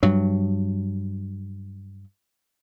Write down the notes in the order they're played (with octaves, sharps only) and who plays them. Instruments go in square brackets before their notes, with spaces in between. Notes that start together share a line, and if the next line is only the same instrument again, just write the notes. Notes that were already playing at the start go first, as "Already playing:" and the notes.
[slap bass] G2 F#3